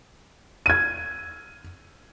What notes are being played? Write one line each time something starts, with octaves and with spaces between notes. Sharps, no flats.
G#6 D#7